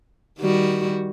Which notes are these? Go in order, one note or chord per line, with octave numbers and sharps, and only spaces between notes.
D#3 G3 F#4